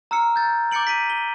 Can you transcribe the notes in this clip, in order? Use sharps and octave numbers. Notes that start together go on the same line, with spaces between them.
A#5 E6 F6 C#7
G6 A6
D6 G6 A6 C#7 D7 F#7
B6 D7 D#7
G7